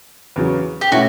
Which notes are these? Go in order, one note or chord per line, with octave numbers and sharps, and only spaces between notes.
E2 C#3 F#3
G4
B2 A3 C#4 E4 F#4